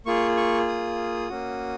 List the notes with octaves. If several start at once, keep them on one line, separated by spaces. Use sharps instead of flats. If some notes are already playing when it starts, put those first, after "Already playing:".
A#3 F4 G#4 C#6
C#6
D#6
A#3 C#4 F#4